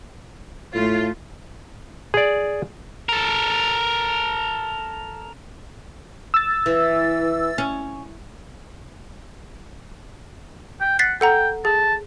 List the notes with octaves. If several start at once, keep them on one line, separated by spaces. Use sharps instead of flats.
A2 A3 F4
G#4 D5
A4 A#4
E6 A6
E3
C#4
G5
F#5 A6 B6 C7
A4 F#5 G5 A#5
G#4 A5